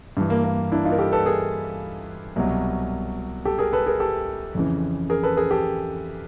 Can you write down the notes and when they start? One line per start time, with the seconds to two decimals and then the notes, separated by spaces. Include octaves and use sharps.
0.17 G2 E3
0.30 A#3
0.44 A#3
0.72 D4 E4
0.85 D#4 F4
0.92 A#4
0.99 G4 A4
1.12 A4 B4
1.26 G#4 A#4
2.36 C2 B2 F#3
3.45 G4 A4
3.59 G#4 A#4
3.73 A4 B4
3.86 G#4 A#4
4.00 G4 A4
4.55 F2 C#3 E3
5.10 G#4 A#4
5.23 A4 B4
5.37 G#4 A#4
5.51 G4 A4